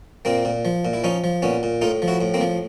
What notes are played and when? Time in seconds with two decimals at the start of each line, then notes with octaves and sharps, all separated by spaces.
0.25 A#2 A#3 C4
0.45 A#2
0.65 F3
0.85 A#2
0.93 E4
1.04 F3 C#4 D#4
1.24 F3
1.42 A#2 B3 C#4
1.63 A#2
1.82 A2 D#4 F4
2.02 F3
2.08 E4 F#4
2.21 A2
2.34 A#3 C4
2.41 F3